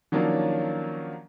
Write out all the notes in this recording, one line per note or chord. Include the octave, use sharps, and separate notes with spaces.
D#3 F3 F#3 A#3 C#4 D4